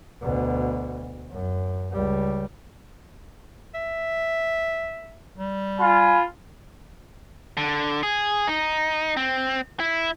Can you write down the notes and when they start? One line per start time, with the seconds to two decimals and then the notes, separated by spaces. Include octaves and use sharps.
0.22 D2 B2
1.31 F#2
1.93 C#2 G3
3.74 E5
5.37 G3
5.80 F4 G#5 B5
7.57 D3
8.03 G#4
8.47 D#4
9.17 C4
9.80 E4